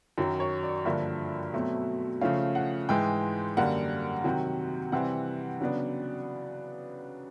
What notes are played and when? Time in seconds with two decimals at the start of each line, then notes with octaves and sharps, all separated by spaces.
0.18 F#2 D#3 F#3
0.40 C#5
0.63 D5
0.85 G2 D3 F3 A#3 E5
1.53 B2 F#3 A3 C4
2.21 C#3 F3 A3 C#4 F5
2.55 F#5
2.89 G#2 E3 G#3 G5
3.57 F#2 D3 G3 A#3 F#5
4.24 C3 D#3 F#3
4.92 C3 E3 G3 C4 F#5
5.60 C#3 F#3 B3 D4